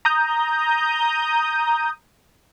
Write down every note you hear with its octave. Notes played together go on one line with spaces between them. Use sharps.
A#5 D#6 G6